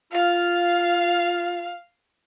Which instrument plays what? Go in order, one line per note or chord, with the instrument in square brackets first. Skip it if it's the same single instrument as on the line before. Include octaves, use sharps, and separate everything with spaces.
[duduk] F4 [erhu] F5